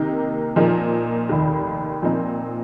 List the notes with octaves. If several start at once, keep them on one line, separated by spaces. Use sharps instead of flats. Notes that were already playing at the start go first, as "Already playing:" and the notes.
Already playing: C3 D#3 A#3 D#4
A#2 F3 A#3 D#4
F1 D#2 D#3
A#2 F3 C4 D#4